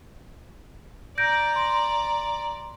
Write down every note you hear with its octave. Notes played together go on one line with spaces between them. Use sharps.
D5 A#5 G6 A#6 D7
C6